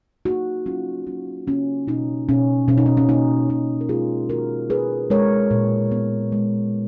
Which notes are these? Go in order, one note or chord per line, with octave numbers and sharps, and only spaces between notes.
A#3 D#4 F#4
F#3 C#4 F4
F#3 C#4
A#3 C#4
B2 D#4
B2 C#4
B2 C#4
D#4
C#4
C#4
A#3 D#4
B2 C#4
A#4
G#3 F4 G#4
D#3 F#4 A#4
B3 G#4 B4
G#3 A#4 C#5
A#2
B3
G#3